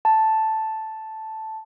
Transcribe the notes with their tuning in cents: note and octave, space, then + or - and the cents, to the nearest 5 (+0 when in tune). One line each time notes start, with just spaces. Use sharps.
A5 +0